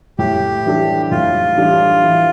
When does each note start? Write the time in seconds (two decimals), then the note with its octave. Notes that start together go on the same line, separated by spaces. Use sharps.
0.19 A2 G4
0.66 E3 G3 D4 A4
1.11 A2 F4
1.57 E3 G3 D4 A4
2.04 E3